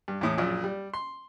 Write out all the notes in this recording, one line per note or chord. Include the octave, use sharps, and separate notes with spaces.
G2
E2 A2 D#6
A#1 F#2 A#2
G3
C6